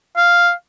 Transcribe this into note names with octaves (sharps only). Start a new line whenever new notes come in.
F5